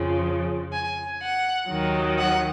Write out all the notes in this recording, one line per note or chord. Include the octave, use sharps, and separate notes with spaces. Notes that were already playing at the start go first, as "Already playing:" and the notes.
Already playing: F2 C#3 F3
G#5
F#5
D#2 D#3 F#3
F#5